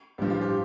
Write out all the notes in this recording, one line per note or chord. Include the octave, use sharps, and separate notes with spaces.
A1 G2 F3 G4
F4
G4